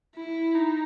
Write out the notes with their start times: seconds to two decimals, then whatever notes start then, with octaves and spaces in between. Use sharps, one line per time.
0.15 E4
0.55 D#4